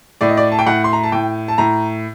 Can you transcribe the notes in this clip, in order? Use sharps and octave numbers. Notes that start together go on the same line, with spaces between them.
A2 D5
D#5
D5
A5
G5
A2 F#5
C6
A#5
A5
A2 G5
A5
A2 A#5